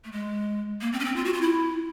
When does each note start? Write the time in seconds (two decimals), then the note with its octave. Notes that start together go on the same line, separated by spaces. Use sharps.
0.05 A3
0.12 G#3
0.81 A#3
0.93 C4
1.00 C#4
1.05 C4
1.16 F4
1.25 F#4
1.33 F4
1.42 E4